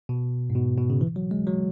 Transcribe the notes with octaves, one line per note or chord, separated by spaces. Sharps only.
B2
G#2
B2
B2
C#3
E3
F#3
G#3
F#3